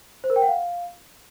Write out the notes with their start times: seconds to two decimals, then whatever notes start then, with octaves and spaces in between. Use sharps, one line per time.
0.24 C5
0.30 A#4
0.36 G5
0.42 F#5
0.48 F5